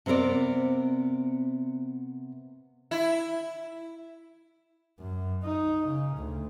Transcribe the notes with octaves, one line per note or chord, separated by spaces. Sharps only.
C3 B3 C4 A#4 D5
E4
F#2
D#4
C#3
D2